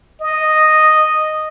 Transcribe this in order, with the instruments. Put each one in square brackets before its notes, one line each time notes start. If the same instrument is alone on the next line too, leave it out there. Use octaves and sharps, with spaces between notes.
[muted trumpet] D#5